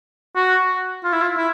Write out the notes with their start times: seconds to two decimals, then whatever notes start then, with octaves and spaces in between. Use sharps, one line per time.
0.36 F#4
1.04 F4
1.13 E4
1.22 F4
1.37 E4